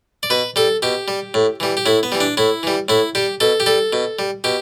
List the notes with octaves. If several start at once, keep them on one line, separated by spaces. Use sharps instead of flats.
D5
B2 B4
G3 A4
B2 G4
G3
A2
E3 G3
G4
A2 E4
B3
E3 G3
D4
A2 E4
E3 G3
A2 E4
G3 G4
B2 A4
G4
G3 A4
B2
G3
B2 G4